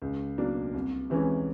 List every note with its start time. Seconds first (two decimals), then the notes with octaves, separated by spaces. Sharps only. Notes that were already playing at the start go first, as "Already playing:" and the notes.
0.02 C#2
0.38 B2 F#3 A#3 D4
0.74 C2
1.10 C3 E3 G#3 C#4